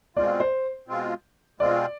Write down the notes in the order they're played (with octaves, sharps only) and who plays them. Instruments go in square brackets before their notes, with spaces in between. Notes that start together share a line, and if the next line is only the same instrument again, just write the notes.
[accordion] B2 G#3 C4 F4 [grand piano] D5
[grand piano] C5
[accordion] B2 G#3 C4 F4
[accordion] B2 G#3 C4 F4 [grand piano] D5